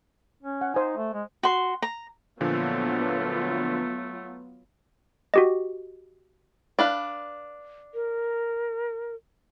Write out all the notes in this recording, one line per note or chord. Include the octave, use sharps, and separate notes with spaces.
C#4
F#5
D#4 C5 G#5
A3
G#3
F#4 C6
A#5
A#2 D3 F3 F#3 A3 B3 F4
F#4 G4 D#5
D4 B4 F5
A#4